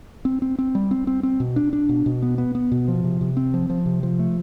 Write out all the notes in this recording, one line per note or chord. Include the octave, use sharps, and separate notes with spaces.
C4
C4
C4
G3
C4
C4
C4
B2
D4
D4
B2
B2
B3
B3
B3
B2
F3
C3
C3
C4
F3
F3
C3
F3
A3